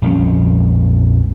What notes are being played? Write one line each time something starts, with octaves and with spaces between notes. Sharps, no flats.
A#1 F2 G3 C#4